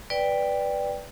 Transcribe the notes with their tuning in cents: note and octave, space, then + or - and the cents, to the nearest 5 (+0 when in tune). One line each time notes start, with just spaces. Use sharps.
B4 +0 D5 +0 G5 +10